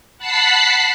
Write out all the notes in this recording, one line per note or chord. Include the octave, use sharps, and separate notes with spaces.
F#5 A5 B5 F#6 B6 C7